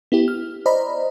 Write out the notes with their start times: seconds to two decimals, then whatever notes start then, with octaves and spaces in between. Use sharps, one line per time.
0.12 B3 E4 G4
0.28 F6
0.66 C5 D5 D#5 A#5 B5